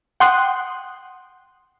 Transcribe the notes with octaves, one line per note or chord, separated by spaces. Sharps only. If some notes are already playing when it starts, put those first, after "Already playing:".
F#5 G5 C6 D#6 F#6